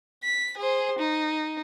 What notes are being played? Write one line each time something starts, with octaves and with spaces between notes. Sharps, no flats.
B6
G#4 C5
D#4